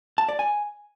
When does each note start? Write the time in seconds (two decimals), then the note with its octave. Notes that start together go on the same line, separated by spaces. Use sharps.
0.18 A5
0.29 D5
0.39 G#5